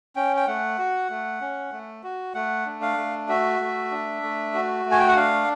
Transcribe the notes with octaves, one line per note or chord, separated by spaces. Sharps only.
C#4 G5
G5
A3 F#5
F#4
A3
C#4
A3
F#4
A3 F#5
D4
F5
A3
F#4 E5
A3
D4
A3
F#4
A3
G#5
G5
F#5
D4 F5